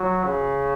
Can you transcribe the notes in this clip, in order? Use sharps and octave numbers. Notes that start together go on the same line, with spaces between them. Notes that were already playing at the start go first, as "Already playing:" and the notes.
Already playing: F#3
C#3